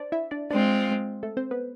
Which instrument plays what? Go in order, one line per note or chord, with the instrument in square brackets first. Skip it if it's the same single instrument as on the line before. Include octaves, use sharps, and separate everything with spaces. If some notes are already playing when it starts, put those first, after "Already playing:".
Already playing: [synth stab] D4 C5 D5
E4 E5
D4 D5
[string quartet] G#3 C4 F4 [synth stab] D4 D5
[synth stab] A3 A4
C4 C5
B3 B4